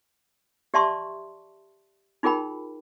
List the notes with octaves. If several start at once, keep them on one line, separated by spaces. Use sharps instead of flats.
G4 D5 E5 A5 C6 C#6
D#4 F4 G#4 A#4 G5 B5